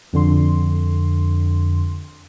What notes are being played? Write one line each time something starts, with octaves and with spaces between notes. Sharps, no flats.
F2 D3 C6